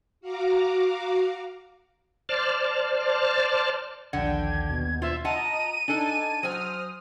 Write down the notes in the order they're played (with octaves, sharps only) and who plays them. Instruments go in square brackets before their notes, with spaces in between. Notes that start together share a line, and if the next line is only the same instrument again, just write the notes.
[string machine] F#4 F5 A#5 D6
[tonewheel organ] C5 D5 A5 F6
[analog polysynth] A#1 D#2 G5 [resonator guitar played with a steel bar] D3 F#5 [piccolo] G#6
[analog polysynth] D#2 B2
[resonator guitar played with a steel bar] F4 C5 [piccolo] E5
[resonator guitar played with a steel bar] F4 F#5 A5 [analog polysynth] D#5 A#5 [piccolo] D#7
[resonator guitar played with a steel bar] D4 A4 [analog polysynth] D#4 G#5 A5
[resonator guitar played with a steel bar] F#3 G#5 [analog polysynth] C5 D#6 F6